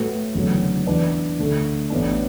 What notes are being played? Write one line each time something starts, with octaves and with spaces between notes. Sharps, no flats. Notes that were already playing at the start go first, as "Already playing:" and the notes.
Already playing: A2 A3 F#4 B4
F#1 E2 D3 F#3 A3
E2 E3 D4 B4 D5
D2 D3 A3
A1 A2 E3 B3 D4